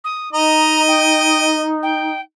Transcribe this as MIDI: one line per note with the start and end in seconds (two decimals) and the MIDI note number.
0.04 0.31 87
0.33 2.18 63
0.33 1.74 75
0.33 0.82 82
0.88 1.46 79
1.83 2.21 79